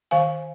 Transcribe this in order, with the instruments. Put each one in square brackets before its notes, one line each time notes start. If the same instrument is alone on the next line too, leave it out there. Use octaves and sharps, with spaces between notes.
[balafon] D#3 F5 G#5